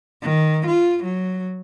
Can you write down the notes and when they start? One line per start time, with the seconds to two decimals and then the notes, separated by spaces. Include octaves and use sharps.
0.21 D#3
0.66 F4
1.03 F#3